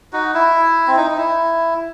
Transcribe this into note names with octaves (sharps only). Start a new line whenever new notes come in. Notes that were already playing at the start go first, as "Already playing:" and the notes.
D#4 F#4
E4
C4
D#4
D#4
E4